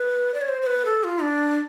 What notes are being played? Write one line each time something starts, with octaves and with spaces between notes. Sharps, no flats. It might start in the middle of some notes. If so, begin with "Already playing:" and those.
Already playing: B4
D5
C#5
C5
C5
B4
A4
F4
D4